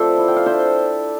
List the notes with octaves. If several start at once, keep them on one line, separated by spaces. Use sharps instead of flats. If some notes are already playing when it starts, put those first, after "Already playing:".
Already playing: F3 A3 C4 A4 C5 D5 E5
E4
G5
F5
D4 C5 E5